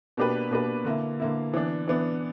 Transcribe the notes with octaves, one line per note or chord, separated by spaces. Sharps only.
B2 A#3 D4 G4 B4
B2 A#3 D4 G4 B4
D3 A#3 E4
D3 A#3 E4
E3 B3 D4
E3 B3 D4